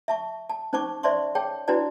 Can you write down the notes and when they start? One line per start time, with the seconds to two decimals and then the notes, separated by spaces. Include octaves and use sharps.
0.08 E5 A5 C#6
0.49 A5
0.73 C#4 D#4 C5 A5 C#6 D6
1.03 C5 D5 E5 A5 C6 C#6
1.35 G#4 C#5 G5 A5
1.68 D4 E4 F#4 B4 D5 A5